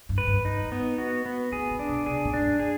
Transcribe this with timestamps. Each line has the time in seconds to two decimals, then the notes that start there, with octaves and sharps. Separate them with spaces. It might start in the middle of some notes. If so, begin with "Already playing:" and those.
0.09 G2
0.18 B4
0.27 G2
0.45 G#2 D#4
0.72 B3
0.98 F#4
1.26 B3
1.52 A2 G#4
1.71 A#2
1.79 D4
1.89 B2
2.06 C3 G#4
2.25 A#2
2.34 D4
2.42 G2
2.60 G#4